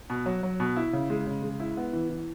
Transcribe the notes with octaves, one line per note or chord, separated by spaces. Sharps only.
B2
F#3
F#3
B2
E4
C#3
G#3
C#3
G#3
E4
B3
E3
E3